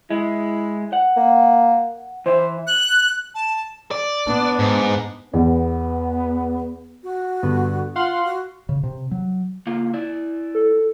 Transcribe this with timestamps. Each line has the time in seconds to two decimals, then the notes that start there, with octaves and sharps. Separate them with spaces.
0.11 G#3 E4
0.93 F#5
1.17 A#3
2.26 E3 C5 E5
2.67 F#6
3.35 A5
3.91 D5
4.27 B3 D4
4.59 G#2
5.33 E2 B3
7.04 F#4
7.43 G2 D3 B3
7.96 F4 F5 F#5 C6
8.25 F#4
8.69 C#3
8.83 C3
9.11 F#3
9.67 C#3 A#3 F4
9.94 E4 D5
10.55 A4